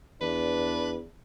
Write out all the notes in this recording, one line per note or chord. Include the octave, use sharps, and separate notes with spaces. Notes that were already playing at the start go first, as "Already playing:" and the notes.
E2 D4 B4